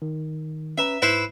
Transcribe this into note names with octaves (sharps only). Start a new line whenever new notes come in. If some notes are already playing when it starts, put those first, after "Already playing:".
D#3
C#4 B4 E5 A#5
G#2 E4 B4 C5